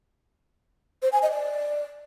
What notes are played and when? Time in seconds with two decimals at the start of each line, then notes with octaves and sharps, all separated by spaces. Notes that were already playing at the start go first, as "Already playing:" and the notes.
1.02 C5
1.12 G#5
1.22 D#5
1.32 D5